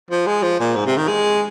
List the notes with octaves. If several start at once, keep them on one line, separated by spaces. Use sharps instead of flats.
F3
G#3
F3
A#2
G#2
C3
D#3
G#3